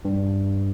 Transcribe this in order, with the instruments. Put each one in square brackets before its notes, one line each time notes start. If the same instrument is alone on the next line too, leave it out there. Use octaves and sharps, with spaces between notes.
[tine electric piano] G2